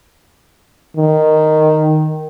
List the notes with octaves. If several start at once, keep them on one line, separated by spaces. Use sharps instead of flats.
D#3